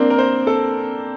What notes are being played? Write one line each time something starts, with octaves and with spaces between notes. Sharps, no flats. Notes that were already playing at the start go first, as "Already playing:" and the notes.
Already playing: A#3 C4 D4
A#4
C5
A4